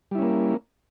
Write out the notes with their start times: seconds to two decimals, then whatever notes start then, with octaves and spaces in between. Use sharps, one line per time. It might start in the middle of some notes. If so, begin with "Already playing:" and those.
0.11 G3
0.15 E4
0.19 C#4
0.22 A#3